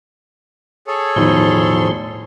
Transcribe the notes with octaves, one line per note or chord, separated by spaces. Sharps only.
G#4 A4 C#5
E1 A2 D#3 F3 C6